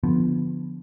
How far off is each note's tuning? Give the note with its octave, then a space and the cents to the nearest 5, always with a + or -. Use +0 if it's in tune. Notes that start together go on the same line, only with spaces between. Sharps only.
D3 +0 F3 +5 B3 +0